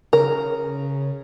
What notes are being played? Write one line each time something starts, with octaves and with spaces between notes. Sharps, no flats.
C#3 A#4